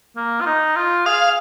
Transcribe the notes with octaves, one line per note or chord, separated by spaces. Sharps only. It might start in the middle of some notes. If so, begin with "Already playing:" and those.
A#3
F4
D#4
F4
G#4 F5